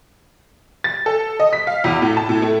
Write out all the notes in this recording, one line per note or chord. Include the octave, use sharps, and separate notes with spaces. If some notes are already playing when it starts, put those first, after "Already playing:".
A6
A4
D#5
B6
F5
E2
A2
A5
A2
A3